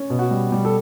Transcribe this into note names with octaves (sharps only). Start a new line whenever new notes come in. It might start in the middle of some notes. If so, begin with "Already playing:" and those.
Already playing: C#4
B2
F#4
G3
G3
A4